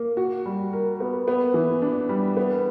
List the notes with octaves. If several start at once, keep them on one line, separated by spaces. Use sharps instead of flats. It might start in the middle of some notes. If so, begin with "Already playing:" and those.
Already playing: A#3
F#4
G3
A#4
B3
B3
E3
D4
G3
B3